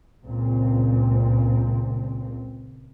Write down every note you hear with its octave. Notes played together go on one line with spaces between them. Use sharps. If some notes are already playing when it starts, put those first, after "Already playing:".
C#2 A#2 C4